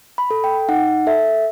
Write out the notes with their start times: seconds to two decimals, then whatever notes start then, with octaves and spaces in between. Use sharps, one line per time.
0.18 B5
0.31 A4
0.44 G5
0.69 D#4 F#5
1.07 A4 E5